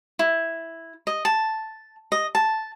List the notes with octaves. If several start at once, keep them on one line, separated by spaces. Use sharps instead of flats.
E4
D#5
A5
D#5
A5